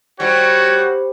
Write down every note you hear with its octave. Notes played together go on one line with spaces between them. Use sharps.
G3 F#4 C5 C#5 B5